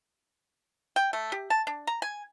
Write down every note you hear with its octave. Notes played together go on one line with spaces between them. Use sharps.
G5
A3
G4
A5
D4
A#5
G#5